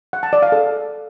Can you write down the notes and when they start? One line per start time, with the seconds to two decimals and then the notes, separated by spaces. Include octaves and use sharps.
0.13 F#5
0.23 A5
0.33 D5
0.42 F5
0.52 A4